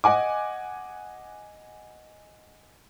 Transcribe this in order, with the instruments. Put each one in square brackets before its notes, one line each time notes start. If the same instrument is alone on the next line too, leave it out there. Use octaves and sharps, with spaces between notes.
[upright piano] D#5 F#5 G#5 D6